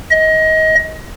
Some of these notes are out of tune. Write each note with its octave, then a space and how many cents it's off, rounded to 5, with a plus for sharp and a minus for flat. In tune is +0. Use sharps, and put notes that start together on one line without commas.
D#5 +25